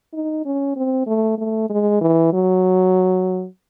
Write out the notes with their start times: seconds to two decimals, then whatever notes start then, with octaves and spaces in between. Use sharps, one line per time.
0.13 D#4
0.45 C#4
0.76 C4
1.07 A3
1.38 A3
1.70 G#3
2.01 E3
2.33 F#3